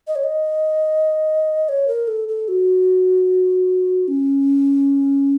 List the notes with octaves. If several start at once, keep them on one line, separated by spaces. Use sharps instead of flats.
D#5
C#5
D#5
C#5
A#4
A4
A4
F#4
C#4